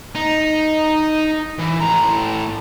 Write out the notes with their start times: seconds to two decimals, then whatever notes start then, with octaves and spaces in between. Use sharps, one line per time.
0.15 D#4
1.59 E3
1.81 A2 A#5